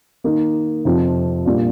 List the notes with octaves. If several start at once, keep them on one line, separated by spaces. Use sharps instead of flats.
D#3 A#3 D#4 A#4
F2 C3 F3
A#2 G3 D4 F4